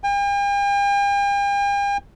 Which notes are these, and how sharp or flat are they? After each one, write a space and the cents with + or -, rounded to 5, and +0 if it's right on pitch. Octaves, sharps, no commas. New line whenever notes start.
G5 +45